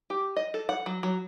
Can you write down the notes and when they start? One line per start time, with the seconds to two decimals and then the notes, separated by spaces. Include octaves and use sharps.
0.10 G4
0.36 D#5
0.54 A4
0.69 F#5
0.86 F#3
1.03 F#3